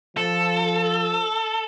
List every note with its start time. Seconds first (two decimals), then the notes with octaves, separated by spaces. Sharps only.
0.17 F3 A4